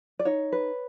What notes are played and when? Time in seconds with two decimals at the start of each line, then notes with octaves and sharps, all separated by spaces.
0.19 D5
0.25 D#4 C#5
0.52 B4